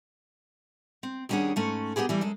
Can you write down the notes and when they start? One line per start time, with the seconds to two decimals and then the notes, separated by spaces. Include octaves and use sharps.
1.03 C4
1.29 D#2 G3 C#4 D4 G#4 F#5
1.56 G#2 A3 C#4
1.96 A#3 B3 C#4 G4 G#4
2.09 E3 G3 A3
2.21 F#2 G#3 A4